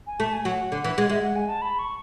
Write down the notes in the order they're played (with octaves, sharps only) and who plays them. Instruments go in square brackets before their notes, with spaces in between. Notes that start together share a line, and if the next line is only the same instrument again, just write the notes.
[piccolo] G#5
[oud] A3 [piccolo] A5
[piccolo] G#5
[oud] F#3 [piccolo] F#5
[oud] D3
E3
G#3
[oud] G#3 [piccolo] E5
[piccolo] F#5
G#5
A5
B5
C#6